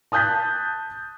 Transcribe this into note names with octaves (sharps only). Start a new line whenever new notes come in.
A5 D#6 F#6 G6 A6 B6